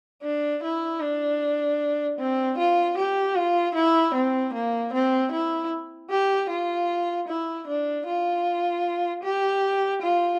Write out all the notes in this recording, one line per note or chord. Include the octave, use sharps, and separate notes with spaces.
D4
E4
D4
C4
F4
G4
F4
E4
C4
A#3
C4
E4
G4
F4
E4
D4
F4
G4
F4